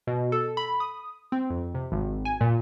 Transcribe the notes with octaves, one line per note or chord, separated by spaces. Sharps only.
B2
A4
B5
D#6
C4
F2
C3
G#1
G#5
A#2